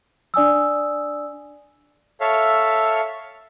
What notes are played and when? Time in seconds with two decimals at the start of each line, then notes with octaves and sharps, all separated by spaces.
0.34 D4 D5 G#5 D#6 E6
2.21 A4 C#5 E5 F5